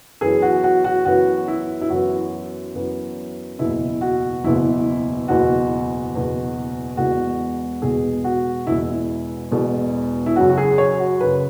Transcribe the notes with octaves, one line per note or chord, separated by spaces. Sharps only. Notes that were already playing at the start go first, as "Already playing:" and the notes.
F#2 E3 B3 G#4
F#4
F#4
F#4
F#2 E3 B3 F#4
E4
E4
F#2 E3 B3 F#4
F#2 E3 B3
F#1 E2 B2 E4
F#4
F#1 E2 B2 E4
F#1 E2 B2 F#4
F#1 E2 B2
E1 E2 B2 F#4
E1 E2 B2 G#4
F#4
E1 E2 B2 E4
E4
E1 E2 B2
E4
F#2 C#3 F#3 F#4
F#4
G#4
C#5
F#4
F#2 C#3 F#3 B4